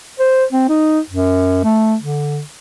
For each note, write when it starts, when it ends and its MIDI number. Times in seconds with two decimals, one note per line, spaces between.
0.19 0.45 72
0.53 0.64 60
0.69 0.99 63
1.10 1.61 42
1.64 1.96 57
2.01 2.40 50